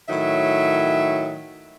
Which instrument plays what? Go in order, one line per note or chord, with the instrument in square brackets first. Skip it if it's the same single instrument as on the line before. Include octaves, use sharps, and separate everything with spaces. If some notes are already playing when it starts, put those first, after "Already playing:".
[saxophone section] A2 D#3 F#3 E5